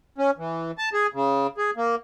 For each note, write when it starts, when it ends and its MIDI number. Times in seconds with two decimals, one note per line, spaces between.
0.18 0.31 61
0.38 0.71 52
0.78 0.89 81
0.93 1.07 68
1.14 1.47 49
1.58 1.71 68
1.77 1.95 58